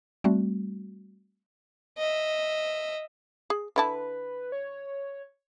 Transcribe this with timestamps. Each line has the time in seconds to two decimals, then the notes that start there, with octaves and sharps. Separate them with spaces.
0.24 G3 A3 C4 F#4
1.98 D#5 E5
3.50 G#4
3.76 D3 E4 B4 A5
4.52 C#5